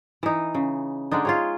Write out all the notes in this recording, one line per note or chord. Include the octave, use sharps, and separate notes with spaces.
E3 D#4
C#3
D3 G#3 D4 D#4
F4 G#4 C#5